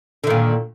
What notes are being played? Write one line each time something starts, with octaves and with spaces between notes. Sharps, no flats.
A#2 D3 D#3